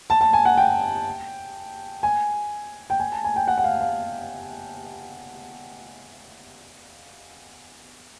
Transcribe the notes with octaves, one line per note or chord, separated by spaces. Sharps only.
A5
A5
G#5
F#5
G5
G#5
G5
G#5
A5
G#5
G5
F#5
F#5
F5
F5